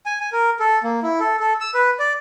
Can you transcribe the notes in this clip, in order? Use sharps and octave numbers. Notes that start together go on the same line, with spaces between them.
G#5
G#5
A#4
A4
A#3
E4
A4
A4
E6
B4
D5